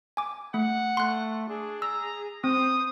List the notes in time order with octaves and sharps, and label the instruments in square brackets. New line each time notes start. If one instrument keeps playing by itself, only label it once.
[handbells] G#5 D6
[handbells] A3 [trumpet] F#5
[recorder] A3 [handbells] C6 F#6
[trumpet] D4 [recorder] G#4
[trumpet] A#5 [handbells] E6
[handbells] C4 [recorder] C5 [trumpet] D#6